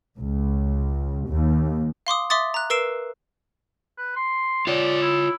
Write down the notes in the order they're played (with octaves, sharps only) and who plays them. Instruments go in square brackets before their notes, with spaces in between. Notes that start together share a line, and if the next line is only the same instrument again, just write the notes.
[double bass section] C#2
D#2
[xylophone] F5 C6 D6 D#6
E5 C6 D6 D#6 A6
A#5 F#6
A#4 B4 E6 C7 D7 E7
[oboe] B4
C6
[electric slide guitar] F4 C#5 [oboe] D5
[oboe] E4